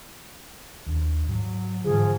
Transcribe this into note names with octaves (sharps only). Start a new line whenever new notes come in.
D#2 D4
G#2 F#3
G#2 D3 E3 F3 G#4